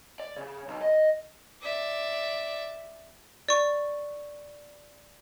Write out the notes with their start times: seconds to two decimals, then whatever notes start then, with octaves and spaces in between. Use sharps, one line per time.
0.20 D5
0.36 C#3
0.68 B1
0.82 D#5
1.62 D5 E5
3.49 D5 C#6